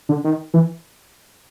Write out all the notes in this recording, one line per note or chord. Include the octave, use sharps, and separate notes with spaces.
D3
D#3
E3